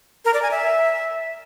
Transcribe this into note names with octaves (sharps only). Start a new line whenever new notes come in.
A#4
D5
G#5
E5